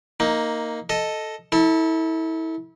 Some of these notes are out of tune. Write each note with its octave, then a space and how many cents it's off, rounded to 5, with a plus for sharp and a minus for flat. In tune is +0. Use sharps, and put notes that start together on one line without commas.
A#3 -5 D#4 +10
A4 +0 D#5 +0
E4 -30 A4 +15